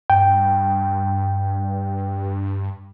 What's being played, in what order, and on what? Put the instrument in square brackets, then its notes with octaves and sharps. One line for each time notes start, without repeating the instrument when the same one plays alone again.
[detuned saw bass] G2 [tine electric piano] G5